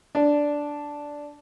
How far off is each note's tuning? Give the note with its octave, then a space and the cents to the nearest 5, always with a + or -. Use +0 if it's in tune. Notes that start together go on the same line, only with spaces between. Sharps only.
D4 -5